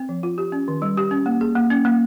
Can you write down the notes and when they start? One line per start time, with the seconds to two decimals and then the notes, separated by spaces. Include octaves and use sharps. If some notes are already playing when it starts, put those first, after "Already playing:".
Already playing: C4
0.09 F3
0.23 F4
0.38 G4
0.52 C#4
0.68 D#3
0.82 G3
0.97 G4
1.11 C#4
1.26 A#3
1.41 G#4
1.55 A#3
1.70 C#4
1.85 A#3